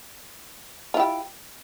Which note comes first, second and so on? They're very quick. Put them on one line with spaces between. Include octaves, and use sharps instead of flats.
F4 E4 G4